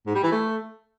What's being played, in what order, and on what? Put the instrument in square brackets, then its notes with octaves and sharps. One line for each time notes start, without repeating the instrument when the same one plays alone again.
[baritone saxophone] G#2
G3
E3
A3